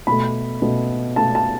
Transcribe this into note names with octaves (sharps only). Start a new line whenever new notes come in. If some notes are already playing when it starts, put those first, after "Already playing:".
B2 A3 B5
B2 A3
B2 A3 A5
A5